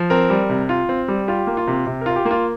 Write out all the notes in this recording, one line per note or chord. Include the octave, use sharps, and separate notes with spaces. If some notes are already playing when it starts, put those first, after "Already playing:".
Already playing: F3
C4 A#4
G3
C3
F4
C4
G3
F4 G4
A#3
F4
C3
C3
F4 A#4
G4
A#3
F4